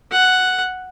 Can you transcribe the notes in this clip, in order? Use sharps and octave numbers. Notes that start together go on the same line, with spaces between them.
F#5